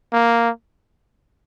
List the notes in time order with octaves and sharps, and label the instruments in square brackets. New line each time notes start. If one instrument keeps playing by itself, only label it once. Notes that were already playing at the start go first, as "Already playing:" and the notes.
[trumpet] A#3